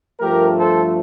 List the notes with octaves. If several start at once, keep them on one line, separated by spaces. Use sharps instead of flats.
G2 F3 A3 G4 A#4
A4 C5